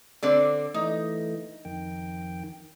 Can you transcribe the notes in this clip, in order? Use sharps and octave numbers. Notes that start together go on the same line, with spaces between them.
D3 C4 D5
E3 A3 D#4
F2 D#3 G5